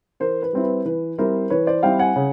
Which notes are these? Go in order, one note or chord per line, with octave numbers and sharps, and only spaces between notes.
E3 A#4 C5
B4
G3 C4 E4
B4
E3 B4
G3 C4 E4 A#4 C5
E3 B4 C#5
C5 D5
G3 C4 E4 F5 G5
F#5 G#5
C#3